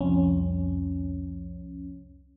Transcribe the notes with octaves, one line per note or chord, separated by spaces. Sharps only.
C2 F2 C#4